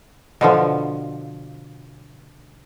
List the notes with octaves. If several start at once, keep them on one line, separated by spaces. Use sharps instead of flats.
B2 D3 F3